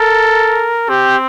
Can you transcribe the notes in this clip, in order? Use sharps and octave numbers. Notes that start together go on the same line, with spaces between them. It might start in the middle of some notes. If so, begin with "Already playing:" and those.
Already playing: A4 A#4
C4 G4